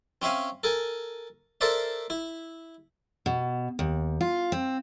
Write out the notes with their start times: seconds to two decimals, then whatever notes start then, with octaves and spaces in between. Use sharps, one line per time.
0.22 C4 C#4 E5 F5 G#5
0.64 A4 A#4 G#5
1.61 A4 A#4 C5 D5 E5
2.10 E4
3.26 B2
3.79 D#2
4.21 F4
4.52 C4